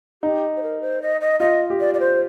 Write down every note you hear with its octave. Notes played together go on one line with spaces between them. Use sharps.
D#4 G4
C5
A#4
C5
D#5
D#5
F4 D#5
G4
D5
D5
C5